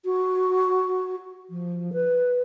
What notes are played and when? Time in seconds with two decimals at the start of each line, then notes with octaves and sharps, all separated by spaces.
0.05 F#4
1.50 F3
1.93 B4